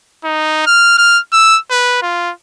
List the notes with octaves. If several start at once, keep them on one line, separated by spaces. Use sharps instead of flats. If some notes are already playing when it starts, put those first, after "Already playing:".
D#4
F6
F6
E6
B4
F4